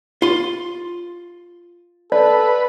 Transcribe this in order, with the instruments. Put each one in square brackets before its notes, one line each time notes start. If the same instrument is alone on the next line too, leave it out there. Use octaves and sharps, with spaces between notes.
[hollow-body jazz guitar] F4 C6
[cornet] A4 [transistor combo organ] B4 [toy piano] D5